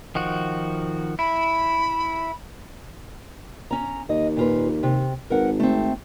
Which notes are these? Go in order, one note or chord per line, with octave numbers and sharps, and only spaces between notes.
D#3 F3 F#4
E4 B5
C#4 A#5
D#2 D#5
A#2 F4 B4
C3
G#1 A#4 B4 F#5
A3 C4